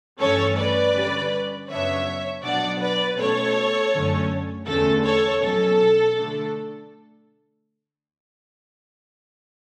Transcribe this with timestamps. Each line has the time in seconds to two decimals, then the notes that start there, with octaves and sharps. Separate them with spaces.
0.21 G2 E3 A3 C#4 A4 C#5
0.58 B4 D5
0.95 D3 G3 C#4
1.70 F#2 C#3 F#3 B3 D4 C#5 E5
2.44 B2 F#3 B3 D4 D5 F#5
2.81 B4 D5
3.18 B2 A3 C#4 A4 C#5
3.93 F#2 D3 A3 C#4
4.67 E2 D3 A3 C#4 A4
5.05 A4 C#5
5.42 B2 F#3 C#4 A4
6.17 D3 A3 D4